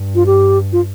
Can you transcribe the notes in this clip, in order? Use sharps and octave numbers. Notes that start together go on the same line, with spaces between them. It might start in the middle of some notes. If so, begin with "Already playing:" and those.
Already playing: G2
F4
G4
F4